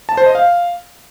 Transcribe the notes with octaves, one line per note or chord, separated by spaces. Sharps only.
A5
C5
D#5
F5